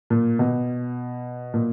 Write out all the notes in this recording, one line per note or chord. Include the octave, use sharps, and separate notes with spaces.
A#2
B2
A#2